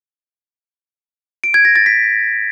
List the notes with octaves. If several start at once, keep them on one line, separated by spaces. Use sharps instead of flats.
D7
G#6
A#6
A6
B6